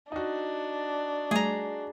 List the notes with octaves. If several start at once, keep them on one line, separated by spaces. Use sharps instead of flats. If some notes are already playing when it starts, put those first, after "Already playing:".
D4 D#4 F#4
G3 A3 G#4 A#5